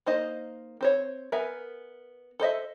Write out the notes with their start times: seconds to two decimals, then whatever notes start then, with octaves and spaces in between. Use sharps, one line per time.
0.06 A#3 D#4 C5 D#5
0.81 C4 C5 C#5
1.32 B3 A#4 E5 G#5
2.40 A4 C5 D#5 E5